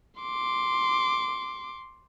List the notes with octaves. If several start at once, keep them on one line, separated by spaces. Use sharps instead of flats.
C6 D6